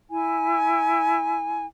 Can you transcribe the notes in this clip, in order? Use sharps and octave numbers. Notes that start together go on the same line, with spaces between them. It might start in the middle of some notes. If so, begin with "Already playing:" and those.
E4 G#5